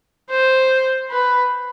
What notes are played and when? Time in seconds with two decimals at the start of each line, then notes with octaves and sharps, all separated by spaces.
0.30 C5
1.10 B4